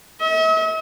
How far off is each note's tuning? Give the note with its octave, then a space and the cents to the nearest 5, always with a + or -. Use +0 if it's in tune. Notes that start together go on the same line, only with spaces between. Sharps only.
E5 -45